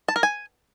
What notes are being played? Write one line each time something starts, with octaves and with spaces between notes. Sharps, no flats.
A5
A#4
G#5